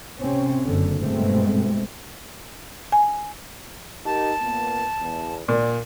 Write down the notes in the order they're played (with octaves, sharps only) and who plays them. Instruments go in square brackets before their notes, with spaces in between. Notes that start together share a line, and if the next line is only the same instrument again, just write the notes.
[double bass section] C3 C4 C#4
F#1 F#2 D3
G2 B2 G#3 A3 C4
[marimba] G#5
[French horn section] D#4 G4 A#4 [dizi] A5
[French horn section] A#2 A#3 B3
E2
[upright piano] A#2 [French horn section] D4 D5